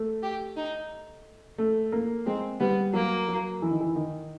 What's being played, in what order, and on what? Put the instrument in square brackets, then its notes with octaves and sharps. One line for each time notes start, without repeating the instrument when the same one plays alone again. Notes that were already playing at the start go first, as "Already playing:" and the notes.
Already playing: [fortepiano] A3
[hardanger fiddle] G4
D#4
[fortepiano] A3
A#3
[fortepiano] G#3 [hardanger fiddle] C4
[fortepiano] G3 [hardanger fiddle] B3
[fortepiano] F#3 [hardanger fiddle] A#3
[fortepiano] F#3
E3
D#3
E3
D#3